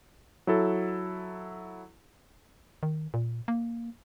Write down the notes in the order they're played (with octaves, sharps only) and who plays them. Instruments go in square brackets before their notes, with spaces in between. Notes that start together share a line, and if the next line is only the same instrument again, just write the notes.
[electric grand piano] F#3 E4 A4
[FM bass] D#3
A#2
A#3